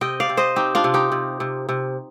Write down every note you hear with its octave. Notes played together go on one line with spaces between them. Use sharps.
C3 D#5 G5
D5 F5
C3
C5 D#5
C4 D#4 G4
D4 F4
C3
D#4 G4
C3
C3
C3